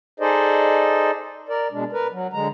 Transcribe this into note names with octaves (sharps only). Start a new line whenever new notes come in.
D#4 G#4 A4 C5 D5 D#5
A#4 D5
B2 G#3 D4
A#4 B4
F#3
D3 G#3 A#5